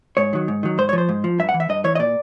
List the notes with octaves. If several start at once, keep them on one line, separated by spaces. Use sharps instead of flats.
G#2 C#5
D#3 F#3
G#2
D#3 F#3
G#2 C5
C#5
F3 C5
G#2
F3
G2 E5
F#5
E3
E5
G2 D#5
E3 C#5
D#5
A#2 D5